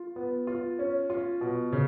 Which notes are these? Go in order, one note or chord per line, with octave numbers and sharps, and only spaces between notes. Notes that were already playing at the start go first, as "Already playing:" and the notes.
Already playing: F4
B3
F4
C#4
F4
B2
C#3